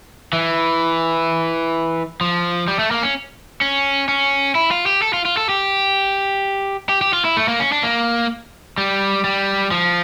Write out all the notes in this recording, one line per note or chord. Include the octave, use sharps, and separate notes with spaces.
E3
F3
G3
A3
A#3
C#4
C#4
C#4
E4
F4
G4
A4
F4
F4
A4
G4
G4
G4
F4
E4
A3
A#3
C#4
D4
A#3
G3
G3
F3